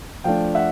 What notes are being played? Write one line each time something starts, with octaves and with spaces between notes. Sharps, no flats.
F3 A3 D4 F5 G5
E5 F#5